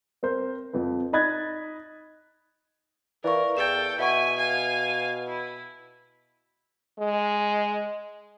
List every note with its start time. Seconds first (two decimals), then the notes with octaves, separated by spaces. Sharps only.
0.23 C4 A#4 C5
0.73 F2 F3 B4
1.13 D#4 D#5 B5 F#6 G#6 A6
3.24 E3 A#4 D5 F5 C#6
3.57 E2 A4 G5 A6 E7
3.99 B2 E4 E5 F#5 G#5 C#6
4.37 F5 G#5
5.28 E4
6.98 G#3